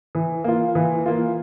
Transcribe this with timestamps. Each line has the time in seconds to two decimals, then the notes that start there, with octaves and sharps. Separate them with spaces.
0.15 E3
0.44 A#3 F4
0.75 E3
1.06 A#3 F4